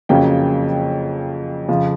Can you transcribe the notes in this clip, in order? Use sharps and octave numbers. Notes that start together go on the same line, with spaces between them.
F2 C#3 F#3 A#3 C#4 G5
F2 C#3 F3